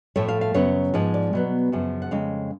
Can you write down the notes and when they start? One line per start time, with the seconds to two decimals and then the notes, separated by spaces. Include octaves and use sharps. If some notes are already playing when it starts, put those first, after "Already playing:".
0.16 A2 F3 A3 C#5
0.28 F5
0.41 F5
0.54 F#2 C#3 F#3 B3 C#5
0.94 G#2 F3 G#3
1.14 D5
1.33 B2 F#3 B3
1.72 F#2 C#3 F3
2.02 F#5
2.11 F2 C#3 G#3 F5